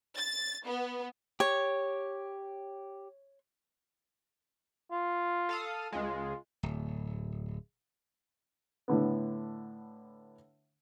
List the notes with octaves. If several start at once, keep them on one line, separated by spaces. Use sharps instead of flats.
A6
B3
G4 C#5
F4
A4 F5 D#6
C#2 G#3 F4
D1
A2 D3 B3